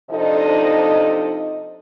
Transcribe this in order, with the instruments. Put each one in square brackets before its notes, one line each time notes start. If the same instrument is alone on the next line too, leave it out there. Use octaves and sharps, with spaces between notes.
[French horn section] C3 F3 D4 D#4 A4 D#5